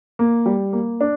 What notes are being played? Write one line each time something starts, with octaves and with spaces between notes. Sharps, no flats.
A#3
G3
A#3
D4